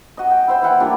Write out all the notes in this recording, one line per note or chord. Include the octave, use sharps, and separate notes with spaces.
F#4 D#5
G5
E4 C5 G5
E3 E4 F#5 G5
A#2 G3 D4